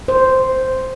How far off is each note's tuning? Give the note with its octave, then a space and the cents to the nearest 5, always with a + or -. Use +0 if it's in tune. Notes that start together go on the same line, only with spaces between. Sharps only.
C5 -5